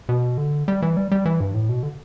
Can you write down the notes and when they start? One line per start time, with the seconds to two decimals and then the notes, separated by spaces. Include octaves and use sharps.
0.09 B2
0.38 D3
0.68 G3
0.82 E3
0.97 G3
1.11 G3
1.25 E3
1.40 G2
1.54 A2
1.69 B2
1.83 D3